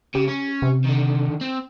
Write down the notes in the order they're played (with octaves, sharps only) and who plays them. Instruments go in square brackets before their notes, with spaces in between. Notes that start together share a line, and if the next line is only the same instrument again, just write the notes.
[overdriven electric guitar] C#3 [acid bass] G4
[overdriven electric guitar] C#4
[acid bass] C3
[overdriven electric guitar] D3 D#3
C4